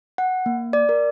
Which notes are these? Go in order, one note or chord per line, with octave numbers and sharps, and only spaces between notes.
F#5
A#3
D5
A#4